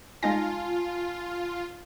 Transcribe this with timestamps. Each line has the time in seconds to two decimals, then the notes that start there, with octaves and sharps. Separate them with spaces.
0.23 G#3 D#4 F4 G#5 A5 A#6